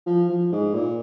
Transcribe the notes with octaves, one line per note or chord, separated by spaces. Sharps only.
F3
F3
G#2
A#2